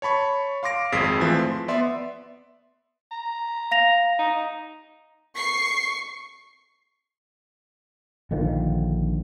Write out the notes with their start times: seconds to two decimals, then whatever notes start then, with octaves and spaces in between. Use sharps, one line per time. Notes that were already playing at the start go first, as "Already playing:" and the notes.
0.02 C#5 A5 B5 C#6
0.63 F5 C6 D6 A#6 D7
0.92 G#1 F2 G#4 D#6 B6 C7
1.20 E3 F3 A3 C4
1.39 C6
1.68 B3 D5 E5 C6
3.11 A#5
3.71 F5 A#6 F7
4.19 D#4
5.36 C#6 C7
8.31 A#1 D3 D#3 F3